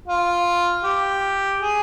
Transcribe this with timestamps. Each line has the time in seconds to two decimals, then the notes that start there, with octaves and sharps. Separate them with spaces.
0.08 F4
0.84 G4
1.60 G#4